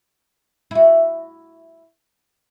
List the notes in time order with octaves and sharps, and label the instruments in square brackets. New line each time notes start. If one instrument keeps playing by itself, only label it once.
[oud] E4 F#4